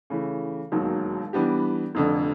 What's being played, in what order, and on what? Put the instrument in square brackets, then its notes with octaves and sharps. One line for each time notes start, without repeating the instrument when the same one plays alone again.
[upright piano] C#3 E3 A3
E1 D#2 D#3 F#3
E3 G3 B3 D4 G4
F1 F2 D3